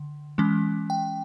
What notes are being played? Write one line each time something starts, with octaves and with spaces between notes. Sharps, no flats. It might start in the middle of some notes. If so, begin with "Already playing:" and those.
Already playing: D3
E3 G#3 C#4
G5